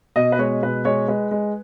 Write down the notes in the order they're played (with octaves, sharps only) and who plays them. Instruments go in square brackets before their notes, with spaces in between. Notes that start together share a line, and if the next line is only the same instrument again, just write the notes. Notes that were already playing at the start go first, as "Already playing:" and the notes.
[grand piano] B2 D#5
B4
G#3 C#5
B2 B4
G#3 C#5
G#3 B4
G#3